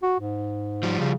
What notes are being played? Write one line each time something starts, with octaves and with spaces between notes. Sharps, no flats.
F#4
G#2
F3 G3
C#3